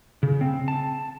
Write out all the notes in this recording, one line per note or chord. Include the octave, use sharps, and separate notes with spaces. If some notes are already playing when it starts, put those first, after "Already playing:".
C#3
C4
A5